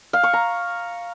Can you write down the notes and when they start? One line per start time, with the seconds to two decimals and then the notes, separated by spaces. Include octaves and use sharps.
0.13 F5
0.23 C#6
0.33 A#5